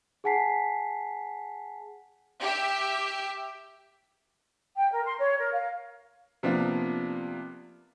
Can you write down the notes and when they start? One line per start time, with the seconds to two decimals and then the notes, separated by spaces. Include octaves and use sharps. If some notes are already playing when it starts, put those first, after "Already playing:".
0.24 G#4 F#5 G#5 A5 B6 C7
2.40 G4 E5
4.76 G5
4.92 A#4
5.05 C6
5.19 C#5
5.38 A#4
5.52 F5
6.43 C3 F3 A#3 B3 D4 F4